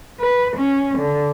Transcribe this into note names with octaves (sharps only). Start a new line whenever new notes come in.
B4
C#4
D3